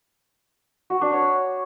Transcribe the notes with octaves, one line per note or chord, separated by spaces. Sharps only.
F#4
D4
C#5